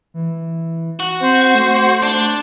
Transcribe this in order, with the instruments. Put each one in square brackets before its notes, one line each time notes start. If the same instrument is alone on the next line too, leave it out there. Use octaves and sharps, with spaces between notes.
[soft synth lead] E3
[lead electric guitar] F#4
[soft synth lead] C4 [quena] C5
[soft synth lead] A3
[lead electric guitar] D4